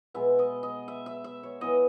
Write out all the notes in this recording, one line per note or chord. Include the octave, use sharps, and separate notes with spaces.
B2 G#3 B3 E5
D#5
D#5
E5
E5
E5
C#5
E3 B3 E4 D#5